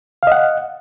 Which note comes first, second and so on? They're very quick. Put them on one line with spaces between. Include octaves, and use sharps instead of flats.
F5 D#5 F#5